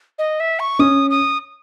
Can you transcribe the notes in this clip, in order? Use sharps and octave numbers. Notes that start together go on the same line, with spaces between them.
D#5
E5
C#6
C#4 D#6
D#6